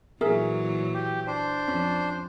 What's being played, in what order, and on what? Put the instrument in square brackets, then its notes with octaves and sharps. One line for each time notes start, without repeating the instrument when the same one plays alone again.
[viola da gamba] A#2 E3 F#3 [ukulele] G#4 A#4 E5
[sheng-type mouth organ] G4
D4 C5
[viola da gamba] F2 [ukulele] C#4